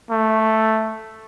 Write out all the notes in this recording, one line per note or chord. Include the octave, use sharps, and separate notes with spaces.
A3